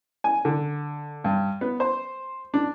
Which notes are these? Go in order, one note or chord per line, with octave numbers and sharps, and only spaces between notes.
G#5
D3
G2
B3
C5
D4